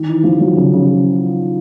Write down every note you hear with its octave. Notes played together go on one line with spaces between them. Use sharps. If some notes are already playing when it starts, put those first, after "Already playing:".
Already playing: D#3
E3
F3
F#3
C#3
C#3